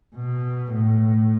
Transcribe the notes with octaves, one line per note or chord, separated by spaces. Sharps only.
B2
A2